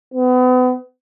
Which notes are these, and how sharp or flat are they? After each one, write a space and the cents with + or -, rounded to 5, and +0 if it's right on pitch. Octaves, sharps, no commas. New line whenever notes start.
B3 +35